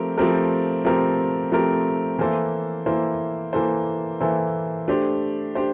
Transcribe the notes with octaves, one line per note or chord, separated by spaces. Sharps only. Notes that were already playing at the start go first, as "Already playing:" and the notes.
Already playing: F3 A3 C4 G4 A#4
F3 A3 C4 G4 A#4
F3 A3 C4 G4 A#4
F3 A3 C4 G4 A#4
E3 A#3 E4 A4 C5
E3 A#3 E4 A4 C5
E3 A#3 E4 A4 C5
E3 A#3 E4 A4 C5
A3 D4 G4 C5
D4 G4 C5